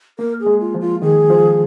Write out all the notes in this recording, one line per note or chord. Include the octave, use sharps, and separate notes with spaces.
A#3 A#4
G#4
G#3
F4
F3
F4
D#3 G#4
F3